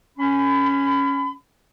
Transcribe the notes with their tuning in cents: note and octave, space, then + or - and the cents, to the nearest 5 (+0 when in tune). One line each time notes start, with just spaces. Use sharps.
C#4 +0 B5 +30